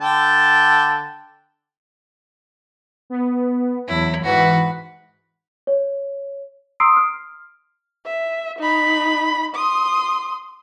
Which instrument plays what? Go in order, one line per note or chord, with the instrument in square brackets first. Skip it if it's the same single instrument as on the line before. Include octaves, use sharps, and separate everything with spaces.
[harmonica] D3 G5 A5
[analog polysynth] B3
[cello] E2 F#3 [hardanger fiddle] E4
[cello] G#2 B4 [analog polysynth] E3 [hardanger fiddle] F#4
[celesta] C#5
A#5 C6 D#6 E6 C7 D7
F6
[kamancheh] E5
D#4 B5
C6 D#6